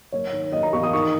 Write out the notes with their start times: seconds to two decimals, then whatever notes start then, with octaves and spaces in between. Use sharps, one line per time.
0.12 F#1 C#5
0.33 D#3
0.52 F#1 D#5
0.63 A#5
0.73 E2 C#6
0.83 D#6
0.93 D#3 C#6